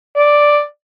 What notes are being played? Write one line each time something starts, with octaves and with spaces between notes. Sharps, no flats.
D5